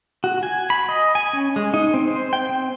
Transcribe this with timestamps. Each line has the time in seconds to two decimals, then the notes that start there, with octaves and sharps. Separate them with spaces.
0.24 F#4
0.43 G#5
0.70 B5
0.89 D#5
1.15 G#5
1.33 C#4
1.56 G#3
1.74 D#4
1.94 C4
2.08 C5
2.33 G5
2.49 C4